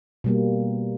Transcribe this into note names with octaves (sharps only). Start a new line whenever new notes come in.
B2 G3 A#3